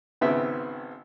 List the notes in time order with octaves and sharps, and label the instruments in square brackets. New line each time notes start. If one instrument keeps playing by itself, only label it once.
[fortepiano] G#1 C#3 B3 C4 E5